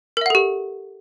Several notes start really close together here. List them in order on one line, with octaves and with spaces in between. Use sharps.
A#4 E5 F#5 A4 G4